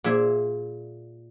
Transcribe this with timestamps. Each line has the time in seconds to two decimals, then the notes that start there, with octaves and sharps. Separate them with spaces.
0.04 A#2 G#4 E5